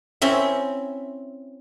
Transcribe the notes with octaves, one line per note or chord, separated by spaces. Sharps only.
C4 C#4 E4